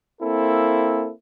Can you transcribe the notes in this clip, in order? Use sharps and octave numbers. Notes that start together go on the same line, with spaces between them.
A#3 C4 E4 A4